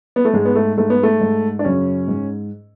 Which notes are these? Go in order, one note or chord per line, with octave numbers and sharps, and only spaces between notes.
B3
A3
G#2 G#3
B3
A3
G#2 A3
B3
A3
G#2
D4
F#2 C#3 C#4
G#2